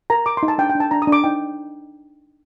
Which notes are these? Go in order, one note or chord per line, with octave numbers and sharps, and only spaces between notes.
A#4 A#5
A#4 D6
C6
D#4
A5
D4 G5
G5
D4
A5
D4 A#5
D#6
D4
D6
D#4 G5